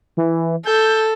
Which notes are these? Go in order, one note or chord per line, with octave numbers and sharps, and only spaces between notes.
E3
A4 G6